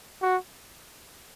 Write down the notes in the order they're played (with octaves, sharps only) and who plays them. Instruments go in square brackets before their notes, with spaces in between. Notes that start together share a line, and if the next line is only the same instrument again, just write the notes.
[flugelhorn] F#4